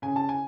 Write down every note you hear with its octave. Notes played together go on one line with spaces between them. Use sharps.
C#3 G#5
A5
G#5